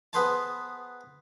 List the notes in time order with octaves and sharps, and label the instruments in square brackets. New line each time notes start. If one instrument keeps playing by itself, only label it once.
[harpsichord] B3 G#4 B4 C5 G#5 A5